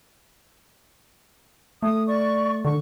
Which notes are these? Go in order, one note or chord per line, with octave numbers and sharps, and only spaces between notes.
A3 D#6
D5 C#6
D3 C#6